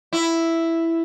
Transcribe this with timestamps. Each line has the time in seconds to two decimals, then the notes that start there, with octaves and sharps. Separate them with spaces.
0.13 E4